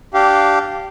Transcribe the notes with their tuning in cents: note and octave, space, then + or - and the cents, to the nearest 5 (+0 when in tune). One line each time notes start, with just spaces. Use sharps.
D4 +0 G4 -15 F5 -10